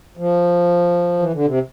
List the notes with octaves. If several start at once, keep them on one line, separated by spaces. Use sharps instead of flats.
F3
E3
D3
C3